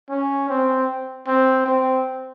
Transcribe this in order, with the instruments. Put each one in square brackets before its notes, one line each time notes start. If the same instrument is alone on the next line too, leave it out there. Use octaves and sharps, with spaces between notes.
[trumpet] C#4
C4
C4
C4